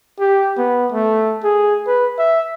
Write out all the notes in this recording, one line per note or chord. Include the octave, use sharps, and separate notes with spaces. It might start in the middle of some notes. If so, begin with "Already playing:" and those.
G4
B3
A3
G#4
B4
E5